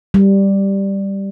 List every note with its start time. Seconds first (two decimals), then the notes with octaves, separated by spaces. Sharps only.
0.14 G3